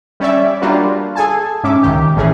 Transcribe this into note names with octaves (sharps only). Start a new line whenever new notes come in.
G3 C#4 C#5 D5 E5
G3 A#3 D4 F4 F#4 B4
G#4 A4 G#5 A5
G#2 C#4 E5 D6
C#2 D#3 G4
G#1 A2 E3 C#4 G#4